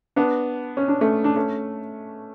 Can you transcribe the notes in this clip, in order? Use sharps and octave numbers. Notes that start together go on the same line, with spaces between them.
B3 D4
C#4
D4
A3 C#4
D4
A3 C#4